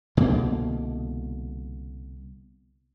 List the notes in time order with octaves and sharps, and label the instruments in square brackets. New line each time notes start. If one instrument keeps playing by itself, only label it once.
[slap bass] C2 B2 D3 A#3